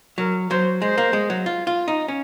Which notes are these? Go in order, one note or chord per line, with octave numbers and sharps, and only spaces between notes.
F#3 A#4
F#3 C5
G#3 C5
A#3
G#3
F#3
F4
F4
D#4
C#4